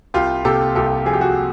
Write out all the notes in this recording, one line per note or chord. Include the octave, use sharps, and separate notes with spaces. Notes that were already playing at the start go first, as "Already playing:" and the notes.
C2 F4 G4
C3 G4 A4
C2 G4 A4
F3 G#4
G4
F#4 G#4